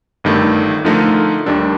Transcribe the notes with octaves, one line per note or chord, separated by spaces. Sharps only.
G1 G2 D#3 A3
D3 F3 A3 D#4 A#4
D#2 D#3 G3 D4 A4